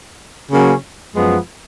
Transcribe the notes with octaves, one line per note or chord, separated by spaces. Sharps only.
C#3 F#3 A#3 C#4
F#2 F3 G#3 B3